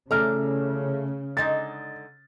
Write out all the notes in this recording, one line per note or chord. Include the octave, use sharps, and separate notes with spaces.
C#3 E3 A3 D5 A#5 F6
D3 G#3 D#4 A6